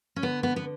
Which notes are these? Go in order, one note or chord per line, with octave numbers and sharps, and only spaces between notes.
C#4
D3 B3
B3
B3